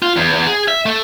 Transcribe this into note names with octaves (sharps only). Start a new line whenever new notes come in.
F4
E2
E2
G#4
E5
A3